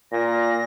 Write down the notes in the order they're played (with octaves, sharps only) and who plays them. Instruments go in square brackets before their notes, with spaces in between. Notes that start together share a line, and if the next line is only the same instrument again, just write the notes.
[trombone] A#2 [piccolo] A#6